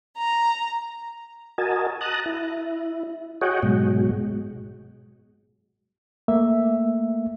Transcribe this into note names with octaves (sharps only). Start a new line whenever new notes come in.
A#5
F#4 A#4 D#5 G#5 A5
A5 A#5 D#6 F#6
E4
F#4 G#4 C#5 D#5 F#5 G5
G#2 B2 F#3 G#3
A3 A#3 E5